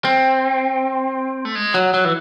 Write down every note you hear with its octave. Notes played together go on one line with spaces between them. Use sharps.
C4
A3
G#3
F#3
F#3
E3